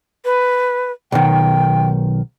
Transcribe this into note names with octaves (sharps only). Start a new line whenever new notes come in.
B4
B1 D#3 G5